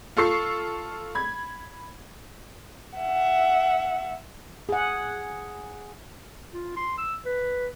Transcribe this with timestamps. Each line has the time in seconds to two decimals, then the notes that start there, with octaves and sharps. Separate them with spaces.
0.17 F4 A4 C#6 C7
1.15 B5 G#6
2.98 E5 F#5
4.69 G#4 F#5
6.53 F4
6.76 C6
6.98 E6
7.25 B4